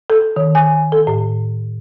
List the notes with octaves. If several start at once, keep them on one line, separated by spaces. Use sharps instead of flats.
A4
D#3
G#5
A4
A2